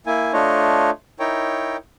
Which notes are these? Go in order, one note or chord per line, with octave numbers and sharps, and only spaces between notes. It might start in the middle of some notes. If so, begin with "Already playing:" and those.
A#3 E4 G#5
A3 D4 F4 C#5 D#5
D#4 E4 A#4 C#5 G5